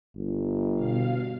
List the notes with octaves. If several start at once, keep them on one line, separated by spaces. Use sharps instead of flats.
G1
B2 F5